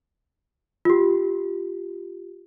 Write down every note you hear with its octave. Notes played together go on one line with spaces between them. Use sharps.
F4 G4